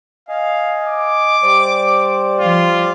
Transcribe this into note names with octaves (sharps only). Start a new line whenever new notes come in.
D#5 F5 G#5
D6
G3 C5 D5
F3 F4